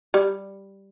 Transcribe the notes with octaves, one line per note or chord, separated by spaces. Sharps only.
G3